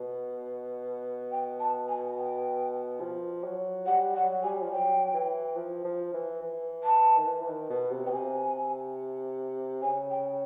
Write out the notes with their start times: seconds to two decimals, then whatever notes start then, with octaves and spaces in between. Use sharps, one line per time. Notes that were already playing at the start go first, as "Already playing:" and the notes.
Already playing: B2
1.31 G5
1.60 A5
1.89 G#5
2.17 G5
3.01 F3
3.44 F#3
3.86 G3 F#5
4.14 F#3 F#5
4.43 G3 G#5
4.62 F3
4.71 F#3 G5
5.14 E3
5.56 F3
5.85 F3
6.14 E3
6.42 E3
6.84 A5
7.16 D#3
7.26 E3
7.42 E3
7.49 D#3
7.70 B2
7.91 C3
8.05 B2 G5
8.12 C3 G#5
9.82 C#3 G#5
10.10 G5